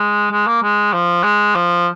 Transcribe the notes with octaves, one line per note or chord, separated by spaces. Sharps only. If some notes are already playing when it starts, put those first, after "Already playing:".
Already playing: G#3
G#3
A#3
G#3
F3
G#3
F3